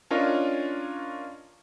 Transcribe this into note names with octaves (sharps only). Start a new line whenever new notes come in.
C#4 D4 F4 A#4 C#5 D#5